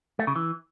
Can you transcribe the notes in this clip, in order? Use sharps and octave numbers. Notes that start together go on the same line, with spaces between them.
A3
C#3
E3